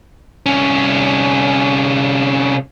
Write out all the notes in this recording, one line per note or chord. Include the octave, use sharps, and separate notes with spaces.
C2 C#4